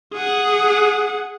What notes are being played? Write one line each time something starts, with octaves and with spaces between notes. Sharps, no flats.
G#4 F#5